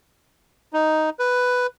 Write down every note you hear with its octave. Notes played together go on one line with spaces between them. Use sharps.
D#4
B4